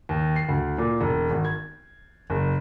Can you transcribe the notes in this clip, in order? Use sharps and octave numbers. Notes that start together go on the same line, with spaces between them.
D#2
C7
D2
A#2
E1
G#1
G#6
F#1